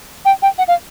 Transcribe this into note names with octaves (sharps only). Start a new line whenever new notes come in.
G5
G5
F#5
F5